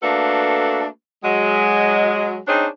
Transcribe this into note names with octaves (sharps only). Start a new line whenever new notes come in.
A3 A#3 D4 F#4 A4 B4
F#3 G#3
C4 D4 D#4 G#4 C5 C#5